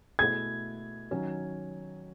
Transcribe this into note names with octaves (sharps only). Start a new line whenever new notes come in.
B2 A3 E4 G#4 G#6
D#3 F#3 C#4